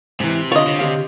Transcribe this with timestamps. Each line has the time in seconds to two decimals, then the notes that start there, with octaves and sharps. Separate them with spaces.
0.20 G#2 C3 E3
0.52 D3 F4 C#5 D#5
0.67 C3
0.79 D3 G4 F5